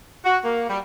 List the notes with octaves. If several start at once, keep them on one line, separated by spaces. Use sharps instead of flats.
F#4
A#3
G3